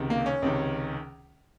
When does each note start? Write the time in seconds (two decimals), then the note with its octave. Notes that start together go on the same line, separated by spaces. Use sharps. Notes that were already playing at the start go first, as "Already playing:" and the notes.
Already playing: C#2 C3 D#3
0.10 A#3
0.26 C#4
0.42 C#2 C3 D#3